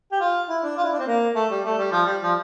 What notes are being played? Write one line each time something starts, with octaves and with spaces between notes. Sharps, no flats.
G4
F4
E4
D4
F4
E4
D4
C4
A#3
A3
G3
A3
G3
F3
G3
F3